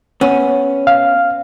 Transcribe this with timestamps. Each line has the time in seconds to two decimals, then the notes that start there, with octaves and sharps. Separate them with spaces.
0.21 B3 C#4
0.87 F5